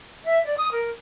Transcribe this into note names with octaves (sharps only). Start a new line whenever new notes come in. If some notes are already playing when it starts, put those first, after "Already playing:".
E5
D5
D#6
A#4